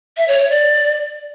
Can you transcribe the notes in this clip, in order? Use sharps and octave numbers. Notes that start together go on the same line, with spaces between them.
E5
C#5
C#5
D5